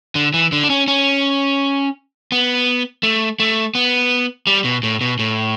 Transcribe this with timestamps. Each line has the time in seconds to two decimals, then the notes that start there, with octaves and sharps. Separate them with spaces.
0.15 D3
0.34 E3
0.52 D3
0.64 D4
0.70 C#4
0.88 C#4
2.32 B3
3.03 A3
3.40 A3
3.75 B3
4.47 G3
4.64 B2
4.83 A2
5.01 B2
5.19 A2